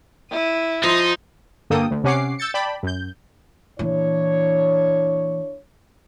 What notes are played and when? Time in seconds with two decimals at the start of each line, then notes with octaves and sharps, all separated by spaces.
0.31 E4 D#7
0.83 F3 D#4 C6 D#6
1.70 G2 D3 A#3 A4 G5 D#6
1.91 D2
2.04 C3 C#4 F#5 D6 C7
2.39 E6 G6 A6 C#7
2.54 D5 G5 A5 B5
2.83 F#2 G6
3.79 A#2 E3 D4 E4 C#5